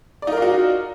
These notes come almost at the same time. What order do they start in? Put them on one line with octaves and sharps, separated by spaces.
D5 D#4 A#4 F4 F#4